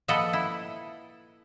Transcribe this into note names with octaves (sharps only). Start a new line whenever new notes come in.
A#2 F3 A4 B4 D#5 F#5
E4